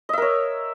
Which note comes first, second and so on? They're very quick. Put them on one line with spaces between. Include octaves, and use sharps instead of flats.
D#5 E5 A#4 C#5